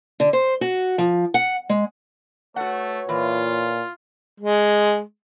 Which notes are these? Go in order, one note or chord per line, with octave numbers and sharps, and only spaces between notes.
D3
C5
F#4
F3
F#5
G#3
A3 F#4 B4 C#5 F#5
A#2 E3 F4
G#3